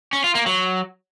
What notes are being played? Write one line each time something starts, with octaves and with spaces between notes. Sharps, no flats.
C#4
F4
A#3
F#3